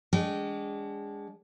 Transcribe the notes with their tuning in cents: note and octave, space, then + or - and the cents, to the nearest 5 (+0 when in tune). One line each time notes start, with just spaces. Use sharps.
G#3 -25 D4 -30 G5 -35